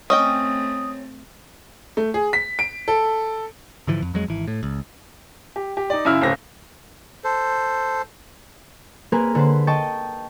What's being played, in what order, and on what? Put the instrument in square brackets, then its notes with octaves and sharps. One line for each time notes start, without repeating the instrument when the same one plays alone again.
[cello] A3 C4 [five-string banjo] C#4 D#5 G5 [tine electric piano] D#6
[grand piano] A3
G#4
B6
D7
A4
[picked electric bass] G#2 D3 E3 F3
F2
F2 F#3 G#3
G#1 E3
A2
C#2
[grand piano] G4
G4
D#4 D5
F#2 C#3 E4 E6 F6
D1 C#3 C4 A#6
[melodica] A4 C5
[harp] A#3 C4 G#4 A#4 B4
D3 B4 C5
D#5 G5 A5 C#6 A6